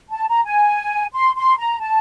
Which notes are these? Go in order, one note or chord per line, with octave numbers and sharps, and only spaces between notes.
A5
A#5
G#5
C6
C6
A#5
A5